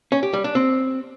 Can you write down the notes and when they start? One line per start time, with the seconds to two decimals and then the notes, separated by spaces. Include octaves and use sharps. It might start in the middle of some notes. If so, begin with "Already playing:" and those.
0.12 C#4
0.23 G4
0.34 G3
0.44 D4
0.55 C4